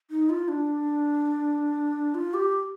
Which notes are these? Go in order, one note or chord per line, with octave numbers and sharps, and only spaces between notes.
D#4
F4
D4
F4
G4